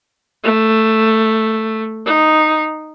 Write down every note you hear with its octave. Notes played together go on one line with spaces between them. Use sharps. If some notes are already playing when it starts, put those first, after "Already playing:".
A3
D#4